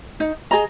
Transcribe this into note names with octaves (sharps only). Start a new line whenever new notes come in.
D#4
G#4 D#5 A#5